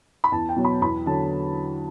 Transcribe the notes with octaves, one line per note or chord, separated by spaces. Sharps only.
B5
E2 A5
G5
B2 F#3
B5
E2 B5
D3 F#3 A5